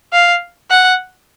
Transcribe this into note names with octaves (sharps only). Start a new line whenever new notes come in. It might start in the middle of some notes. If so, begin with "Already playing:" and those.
F5
F#5